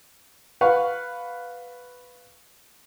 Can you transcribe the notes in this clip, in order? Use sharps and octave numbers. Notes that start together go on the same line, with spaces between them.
B4 F5 F#5 C#6